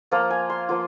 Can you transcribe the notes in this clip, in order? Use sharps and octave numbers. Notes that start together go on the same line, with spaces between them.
F3 A#3 F4 A#5
G#5
C6
F3 A#3 F4